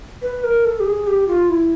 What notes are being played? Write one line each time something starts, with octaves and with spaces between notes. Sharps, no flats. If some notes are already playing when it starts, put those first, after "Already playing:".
B4
A#4
A4
G4
G#4
G4
F4
E4